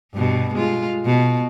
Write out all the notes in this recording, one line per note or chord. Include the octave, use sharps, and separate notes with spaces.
G2 B2
G#3 F4
B2